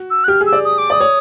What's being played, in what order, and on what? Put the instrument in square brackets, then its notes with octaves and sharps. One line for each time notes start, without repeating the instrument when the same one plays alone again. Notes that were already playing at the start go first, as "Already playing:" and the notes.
Already playing: [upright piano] F#4
[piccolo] E6
F#6
[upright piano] G4 [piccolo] F6
[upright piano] G#4
[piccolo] E6
[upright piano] D5
[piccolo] D#6
D6
[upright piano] D5 [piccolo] D#6
[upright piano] C#5